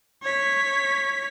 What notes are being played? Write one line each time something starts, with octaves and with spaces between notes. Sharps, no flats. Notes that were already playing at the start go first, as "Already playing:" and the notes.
C#5 B6